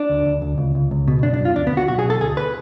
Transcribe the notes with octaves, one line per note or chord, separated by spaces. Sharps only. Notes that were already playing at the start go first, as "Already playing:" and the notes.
Already playing: D4
D2
D2
D2
C#2
C#2
C#2
B2
F#2 D4
D4
F#2
F4
D2 D4
B3
D2
F#4
B1 F#4
G#4
B2 A4
D2 G#4
B4